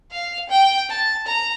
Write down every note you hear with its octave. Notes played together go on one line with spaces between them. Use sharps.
F5
G5
A5
A#5